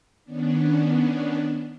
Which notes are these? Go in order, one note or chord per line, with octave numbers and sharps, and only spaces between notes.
D#3 B3 C#4 D4